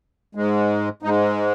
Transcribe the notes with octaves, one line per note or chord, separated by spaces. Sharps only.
G#2 G#3
G#2 G#3 D#4